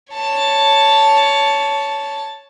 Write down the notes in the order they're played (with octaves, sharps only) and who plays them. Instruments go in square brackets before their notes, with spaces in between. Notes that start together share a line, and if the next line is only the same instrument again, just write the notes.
[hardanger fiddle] C#5 A5